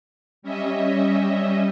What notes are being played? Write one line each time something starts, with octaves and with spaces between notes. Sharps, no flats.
G3 C#4 D#5 E5